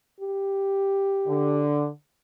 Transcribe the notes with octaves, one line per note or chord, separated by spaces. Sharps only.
G4
D3